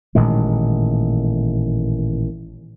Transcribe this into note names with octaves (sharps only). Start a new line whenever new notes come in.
A1 A#2 D#3 G#3